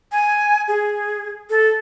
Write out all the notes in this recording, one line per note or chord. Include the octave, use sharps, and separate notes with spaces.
G#5
G#4
A4